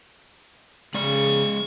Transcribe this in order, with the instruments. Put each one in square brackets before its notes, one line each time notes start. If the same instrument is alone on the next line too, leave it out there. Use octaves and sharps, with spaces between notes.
[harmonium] C#3 [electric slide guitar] G#3 D5 [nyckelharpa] C#6